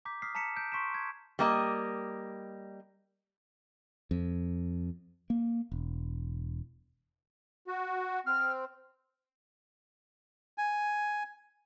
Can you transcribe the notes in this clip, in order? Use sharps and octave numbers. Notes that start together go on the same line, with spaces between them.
A#5 D6 G6 B6
D#6 F6 B6 C7
A5 A#5 B6 C#7 E7
G6 D7
C6 C#6 B6 D7 E7
G#6
G3 A#3 D#5
F2
A#3
E1
F#4
C4 F6
G#5